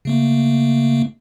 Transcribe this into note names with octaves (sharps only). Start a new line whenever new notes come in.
C#3 A3 A#3